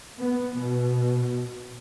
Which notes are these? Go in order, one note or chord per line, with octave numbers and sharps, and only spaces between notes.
B3
B2